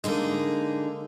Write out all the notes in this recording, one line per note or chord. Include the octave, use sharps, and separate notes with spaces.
D3 G#3 A#3 D#4 G#4